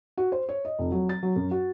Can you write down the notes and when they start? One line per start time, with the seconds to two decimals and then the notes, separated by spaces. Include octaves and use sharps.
0.18 F#4
0.32 C5
0.49 C#5
0.65 D#5
0.79 F1
0.92 F#3
1.09 A6
1.23 F#3
1.36 F#2
1.51 F#4